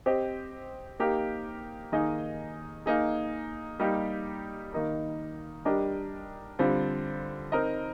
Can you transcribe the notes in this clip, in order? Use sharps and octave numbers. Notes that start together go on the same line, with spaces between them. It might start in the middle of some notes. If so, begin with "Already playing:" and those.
C4 G4 C5 D#5
A#3 D#4 G4 A#4
D#3 A#3 D#4 G#4 D#5
A#3 D#4 G#4
G3 A#3 D#4 G4
D#3 A#3 D#4 A#4
G3 D4 G4 A#4 D#5
D3 G3 C4 F4
C4 D#4 A#4 D#5